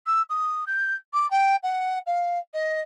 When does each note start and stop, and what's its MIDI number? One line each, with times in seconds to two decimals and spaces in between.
0.06 0.22 88
0.29 0.64 87
0.66 0.95 91
1.13 1.29 86
1.30 1.56 79
1.63 1.99 78
2.06 2.38 77
2.53 2.80 75